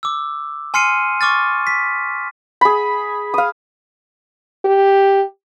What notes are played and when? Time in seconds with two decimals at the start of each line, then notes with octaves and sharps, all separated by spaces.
0.03 D6 E6
0.74 G#5 C6 F6 C7 C#7 D#7
1.21 C#6 D6 F6 A6
1.67 B6
2.61 G#4 B5
3.34 F5 D#6
4.65 G4